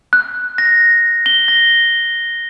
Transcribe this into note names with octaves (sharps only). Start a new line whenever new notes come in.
F#6
A#6
G7
A#6